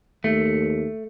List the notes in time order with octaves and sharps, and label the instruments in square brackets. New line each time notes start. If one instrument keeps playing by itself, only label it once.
[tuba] D#2 [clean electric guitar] A3